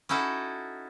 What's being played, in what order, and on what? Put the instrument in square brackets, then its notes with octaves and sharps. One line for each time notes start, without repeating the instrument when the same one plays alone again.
[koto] C#4 D#4 E4 F#4 A4